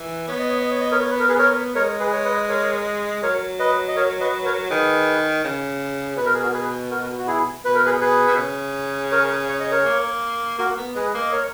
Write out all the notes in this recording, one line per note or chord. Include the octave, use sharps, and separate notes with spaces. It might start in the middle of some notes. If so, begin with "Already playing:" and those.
Already playing: E3
B3 C#5
D#5
C#5
D#5
C#5
D#5
A#4 C#5
C#5
B4
A#4
G#4 B4
A#4 C#5
G#3 A#4 C#5
G#4 B4
C#5
B4 D#5
A#4 C#5
F#3 A#4 C#5
B4 D#5
D#5
A#4 C#5
B4 D#5
B4
A#4 C#5
D#3 G#4 B4
C#3
B2 B4
A#4
G#4
F#4 A#4
G#4 B4
F#4 A#4
F#4
E4 G#4
B2 B4
A#4
G#4 B4
G#4 B4
B2
C#3
A#4 C#5
C#5
D#5
A#4 C#5
A#3
A#3 F#4 A#4
B3
G#3 G#4 B4
A#3
D#5
A#4 C#5